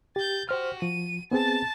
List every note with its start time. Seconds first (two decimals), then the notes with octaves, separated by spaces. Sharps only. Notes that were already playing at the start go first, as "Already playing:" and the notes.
0.16 G4 G6 A6
0.49 F#4 G4 C5 F6
0.82 F3 D#7
1.31 B3 C4 G#4 A5 A6